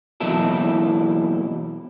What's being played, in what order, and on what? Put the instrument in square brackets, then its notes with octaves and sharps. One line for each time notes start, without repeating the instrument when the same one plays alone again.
[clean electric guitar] B2 E3 F#3 A#3 E4 A4